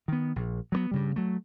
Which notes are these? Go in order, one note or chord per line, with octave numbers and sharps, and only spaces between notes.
D#3 B3
A#1
F#3 G#3 B3
G2 C#3 G3
F#3 A3